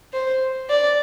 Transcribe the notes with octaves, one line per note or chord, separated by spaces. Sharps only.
C5
D5